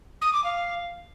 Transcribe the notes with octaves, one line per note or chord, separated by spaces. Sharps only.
D#6
D6
F5